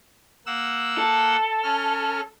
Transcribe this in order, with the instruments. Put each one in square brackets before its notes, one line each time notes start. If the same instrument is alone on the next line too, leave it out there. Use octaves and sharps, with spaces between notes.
[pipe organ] A#3 F#5 E6
[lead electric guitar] A4
[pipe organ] C#4 F6